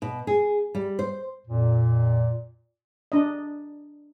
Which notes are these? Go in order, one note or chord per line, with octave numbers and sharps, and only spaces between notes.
B2
G#4
G3
C5
F2 A#2
D4 D#5